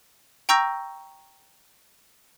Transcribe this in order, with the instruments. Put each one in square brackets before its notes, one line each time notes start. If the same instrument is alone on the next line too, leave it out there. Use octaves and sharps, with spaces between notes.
[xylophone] G5 A#5 C#6 E6 G6 A#6